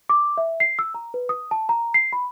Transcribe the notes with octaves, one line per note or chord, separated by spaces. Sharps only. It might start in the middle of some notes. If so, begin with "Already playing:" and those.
D6
E5
C7
E6
A#5
B4
D#6
A5
A#5
C7
B5